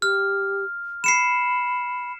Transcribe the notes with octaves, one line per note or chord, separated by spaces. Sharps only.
G4 F6
B5 C7 C#7 E7